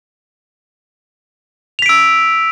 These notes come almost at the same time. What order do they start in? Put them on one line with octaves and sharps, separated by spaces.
F7 B6 D7 E6